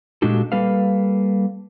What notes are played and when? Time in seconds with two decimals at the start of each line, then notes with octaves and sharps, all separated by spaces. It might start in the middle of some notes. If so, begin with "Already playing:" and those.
0.22 A#2 G#3 D4 F#4 G4 A4
0.52 G3 A#3 A4 B4 F5